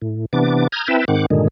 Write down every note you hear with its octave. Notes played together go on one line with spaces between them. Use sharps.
A2
C3 E3 B3 D4 D6
A#5 D#6 F6 G6 G#6
C4 E4 B4 E5 G5 A5
G#2 D#3 C4 F#5 D6
G2 A#2 D3 D#3 G#3